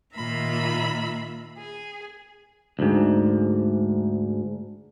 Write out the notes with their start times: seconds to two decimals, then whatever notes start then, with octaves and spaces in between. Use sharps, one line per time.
0.15 A#2 D#3 F4 E5 A#5 B5
1.58 G#4
2.79 D2 G#2